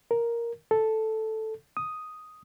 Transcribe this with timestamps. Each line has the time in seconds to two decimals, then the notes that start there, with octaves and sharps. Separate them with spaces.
0.11 A#4
0.71 A4
1.77 D#6